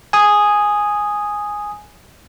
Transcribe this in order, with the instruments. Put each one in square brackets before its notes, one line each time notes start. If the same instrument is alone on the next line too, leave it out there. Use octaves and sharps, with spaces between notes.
[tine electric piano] G#5 D#6